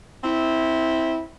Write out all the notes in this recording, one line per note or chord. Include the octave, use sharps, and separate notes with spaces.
C4 E4